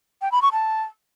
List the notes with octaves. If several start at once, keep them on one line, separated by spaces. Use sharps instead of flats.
G5
B5
C#6
A5